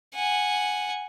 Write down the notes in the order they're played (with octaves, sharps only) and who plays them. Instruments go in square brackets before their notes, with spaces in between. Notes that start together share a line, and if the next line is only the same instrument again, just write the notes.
[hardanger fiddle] F#5 G#5